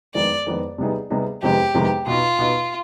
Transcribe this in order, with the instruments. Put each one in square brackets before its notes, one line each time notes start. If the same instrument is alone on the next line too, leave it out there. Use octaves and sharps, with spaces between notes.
[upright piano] F2 D#3 G#3 B3 [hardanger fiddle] D5
[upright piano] F2 D#3 G#3 B3
C3 G3 B3 D#4 G#4
C3 G3 B3 D#4 G#4
[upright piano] F2 C3 D#3 G#3 B3 [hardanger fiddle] G4
[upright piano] F2 C3 D#3 G#3 B3
[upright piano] B2 B3 D#4 [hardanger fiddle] F4
[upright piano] B2 B3 D#4